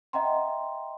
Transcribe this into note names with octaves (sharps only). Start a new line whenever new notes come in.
D#5 E5 F#5 G5 A#5 C6